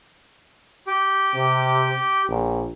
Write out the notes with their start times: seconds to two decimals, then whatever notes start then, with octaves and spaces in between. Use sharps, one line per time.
0.87 G4 D6
1.34 C3
2.29 A#1